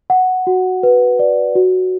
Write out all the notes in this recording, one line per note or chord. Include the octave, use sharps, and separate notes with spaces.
F#5
F#4
B4
D5
F#4